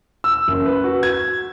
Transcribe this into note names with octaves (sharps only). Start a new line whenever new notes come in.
E6
F#1
B4
F#4
G#6